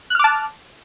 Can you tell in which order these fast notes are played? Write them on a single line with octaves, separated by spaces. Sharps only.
F#6 F6 D6 A5